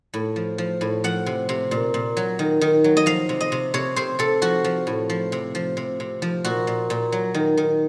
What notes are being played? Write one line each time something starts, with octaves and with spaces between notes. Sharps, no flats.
A2
F3
F3
A2
F3 F#5
C3
C3
A#2
A#2
F#3
D#3
D#3
F#3
D#5
F3 F5
C3
D#5
C3
C3 C#5
C3 C5
C3 A4
F3 F#4
F3
A2
F3
C3
F3
C3
C3
F3
A#2 F#4
A#2
A#2
F#3
D#3
D#3